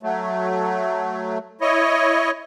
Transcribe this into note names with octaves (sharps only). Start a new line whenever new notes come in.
F#3 A3
E4 C#5 D#5